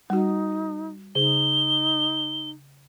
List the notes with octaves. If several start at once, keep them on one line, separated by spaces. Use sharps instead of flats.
G3 D#4 F#4
C#3 D#4 G#4 G7